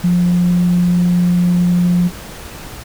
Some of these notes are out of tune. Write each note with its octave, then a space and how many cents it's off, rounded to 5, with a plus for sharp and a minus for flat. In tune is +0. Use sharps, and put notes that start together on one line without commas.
F3 +20